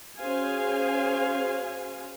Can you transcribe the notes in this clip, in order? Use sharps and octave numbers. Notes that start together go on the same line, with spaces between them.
C#4 F#4 G#4 C5 F5 G#5